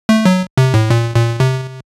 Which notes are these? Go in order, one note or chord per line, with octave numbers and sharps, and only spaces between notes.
A3
F#3
C3
A2
A#2
A#2
C3